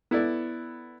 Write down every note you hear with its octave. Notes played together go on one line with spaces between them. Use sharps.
B3 E4 A4 D5 E5